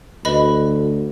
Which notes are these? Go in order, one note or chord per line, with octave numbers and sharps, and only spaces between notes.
D2 B4 D#5 B5